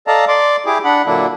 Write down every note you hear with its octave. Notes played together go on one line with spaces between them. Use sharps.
A4 D5 D#5 F5 A5 A#5
D5 C6 D6
E4 G4 G#4 D6
D4 F#5 B5
A#2 D3 F#3 A#3 D4 E4